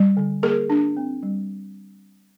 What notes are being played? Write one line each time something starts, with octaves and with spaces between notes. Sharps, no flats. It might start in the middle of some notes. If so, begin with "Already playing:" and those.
Already playing: G3
D3
A#3 G#4 A#4
D4
C4
G3